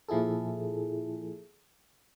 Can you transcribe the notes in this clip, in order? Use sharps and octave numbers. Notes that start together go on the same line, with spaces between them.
A#2 F3 E4 G#4 A4